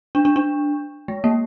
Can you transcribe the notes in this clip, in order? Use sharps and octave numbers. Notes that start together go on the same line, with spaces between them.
D4
D4
D4
G#3
A#3